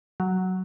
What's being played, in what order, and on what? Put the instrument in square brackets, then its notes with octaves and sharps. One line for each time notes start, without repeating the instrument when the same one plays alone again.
[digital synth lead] F#3